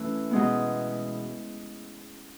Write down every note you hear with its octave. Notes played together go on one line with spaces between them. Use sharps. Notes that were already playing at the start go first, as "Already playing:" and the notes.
Already playing: E3 A3 C#4
B2 G#3 B3